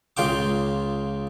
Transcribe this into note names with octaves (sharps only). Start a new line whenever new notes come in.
C#2 C#3 F4 G5 D6